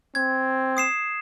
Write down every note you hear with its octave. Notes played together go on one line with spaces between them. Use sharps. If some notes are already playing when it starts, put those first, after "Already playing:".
C4 G#6
D#6 C7 E7